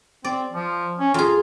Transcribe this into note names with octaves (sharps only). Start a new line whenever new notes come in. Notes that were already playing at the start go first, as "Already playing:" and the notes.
C4 D5
F3
C#4
F2 F4 G#4